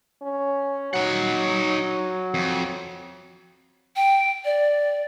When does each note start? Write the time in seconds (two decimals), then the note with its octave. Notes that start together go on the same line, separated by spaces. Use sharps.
0.22 C#4
0.94 F#3 D#4 F#5
2.34 F2
3.96 G5
4.45 D5